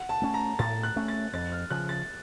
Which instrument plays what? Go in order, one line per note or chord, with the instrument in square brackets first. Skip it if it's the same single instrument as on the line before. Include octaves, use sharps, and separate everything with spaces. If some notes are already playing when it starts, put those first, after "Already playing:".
Already playing: [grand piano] F#5
A5
[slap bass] A3 C#4
[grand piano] A#5
[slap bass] A2 [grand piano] A6
[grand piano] F#6
[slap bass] A3 C#4
[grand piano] A6
[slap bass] F2 [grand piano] A6
[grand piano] F6
[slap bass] C#3 F3 [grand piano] F#6
[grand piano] A6